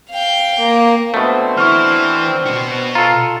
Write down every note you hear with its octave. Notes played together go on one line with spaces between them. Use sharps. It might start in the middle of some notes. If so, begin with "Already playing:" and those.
F5 G5
A#3
B2 A3 C4 D4 C5
E3 C#6 F6
B2 F#4
F4 A4 A#5